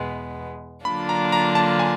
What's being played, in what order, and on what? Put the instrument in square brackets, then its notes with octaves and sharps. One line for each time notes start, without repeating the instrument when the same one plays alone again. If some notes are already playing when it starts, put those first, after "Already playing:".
Already playing: [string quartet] E2 B2 G#3 B3
[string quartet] D3 F#3 A#3 D4 F4 [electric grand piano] B5
[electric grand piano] A#5
A#5
A5
G#5